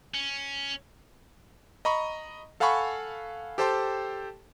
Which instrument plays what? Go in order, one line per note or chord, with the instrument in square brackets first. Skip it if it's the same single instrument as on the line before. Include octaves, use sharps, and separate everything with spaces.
[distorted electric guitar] C#4
[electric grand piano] D#5 A#5 B5 C#6
A4 F5 F#5 G#5 B5 C#6
G4 A4 C5 G5 A5 C6